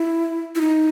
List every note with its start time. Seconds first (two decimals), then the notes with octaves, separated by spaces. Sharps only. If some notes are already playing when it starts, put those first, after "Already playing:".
Already playing: E4
0.55 E4
0.61 D#4